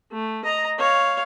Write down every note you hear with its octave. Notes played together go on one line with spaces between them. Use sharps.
A3
D#5 A#5
C#5 F5